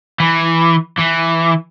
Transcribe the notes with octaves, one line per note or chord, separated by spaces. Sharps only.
E3
E3